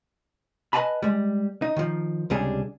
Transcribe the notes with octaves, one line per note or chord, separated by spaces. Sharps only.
B4 D#5 F5 G#5 A5 B5
G3 G#3
D#4
D#3 F3
C#2 C3 G3 D4 G#4